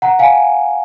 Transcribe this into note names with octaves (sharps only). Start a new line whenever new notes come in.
F#5 A#5
F5 G#5